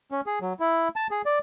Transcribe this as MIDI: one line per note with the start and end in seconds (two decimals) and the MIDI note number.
0.12 0.21 61
0.26 0.39 68
0.41 0.53 54
0.60 0.88 64
0.96 1.07 81
1.11 1.22 68
1.26 1.39 74